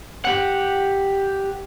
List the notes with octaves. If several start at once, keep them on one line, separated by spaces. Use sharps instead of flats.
G4 F#5